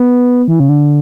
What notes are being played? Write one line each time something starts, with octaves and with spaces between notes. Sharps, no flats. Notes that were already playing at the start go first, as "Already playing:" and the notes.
Already playing: B3
E3
C#3
D3